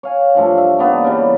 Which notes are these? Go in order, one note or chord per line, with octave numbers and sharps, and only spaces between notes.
C#5 F5 G#5
G2 F3 A3
E5
A#3 B3 D4 D#4
C#3 E3 G3